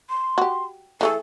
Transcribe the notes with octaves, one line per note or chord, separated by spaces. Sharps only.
C6
F#4 G4
E3 A3 G#4 A4